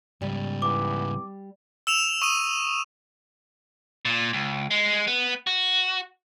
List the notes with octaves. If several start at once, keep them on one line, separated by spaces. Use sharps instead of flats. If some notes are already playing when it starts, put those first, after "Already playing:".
G#2 C#3 G3
E3 D6
E6 E7 F7
C#6 D#6 D#7
A#2
C#2
G#3
B3
F#4